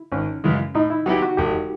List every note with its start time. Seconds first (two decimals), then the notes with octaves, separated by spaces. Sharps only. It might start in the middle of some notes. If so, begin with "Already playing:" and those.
Already playing: E4
0.12 G#1 C#4
0.44 F#2 C#3 E3 G#3
0.75 A2 D#4
0.90 E4
1.06 F#3 B3 E4 F#4 G4
1.23 F#4
1.37 E1 G4